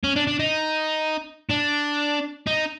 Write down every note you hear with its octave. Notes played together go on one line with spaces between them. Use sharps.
C#4
D4
D4
D#4
D4
D#4